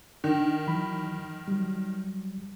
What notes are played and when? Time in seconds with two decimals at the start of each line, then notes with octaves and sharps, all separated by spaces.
0.24 D#3 D4
0.67 E3 F#3 B5
1.48 F#3 G3